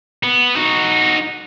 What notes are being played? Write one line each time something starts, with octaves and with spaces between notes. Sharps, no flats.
B3
D#4 F#4